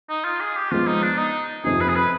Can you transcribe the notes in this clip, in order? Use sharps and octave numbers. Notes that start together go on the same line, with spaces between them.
D#4
F4
G#4
G4
F3 G#3 B3 F4
D#4
D4
D#4
F2 C3 F3 C4 D#4 G#4
B4
G#4
B4